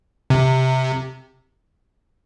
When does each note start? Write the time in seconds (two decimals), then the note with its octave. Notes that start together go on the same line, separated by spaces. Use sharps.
0.30 C3